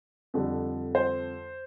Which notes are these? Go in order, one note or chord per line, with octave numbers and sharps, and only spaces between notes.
F2 D3 G3
C5